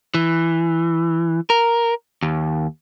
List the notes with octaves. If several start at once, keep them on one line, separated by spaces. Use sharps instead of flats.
E3
A#4
D#2